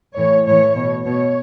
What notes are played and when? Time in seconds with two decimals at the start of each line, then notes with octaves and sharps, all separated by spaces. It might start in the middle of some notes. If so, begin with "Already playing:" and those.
0.17 A2 E3 C#5
0.47 A2 E3 C#5
0.75 B2 C#5
1.06 B2 C#5